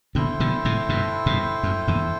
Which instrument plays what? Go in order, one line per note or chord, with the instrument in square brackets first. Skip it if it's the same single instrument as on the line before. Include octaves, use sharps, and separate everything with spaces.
[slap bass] B2 D3 [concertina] E4 A4 C5 G5
[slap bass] B2 D3
A2 C3
G2 B2
G2 B2
F#2
E2 G2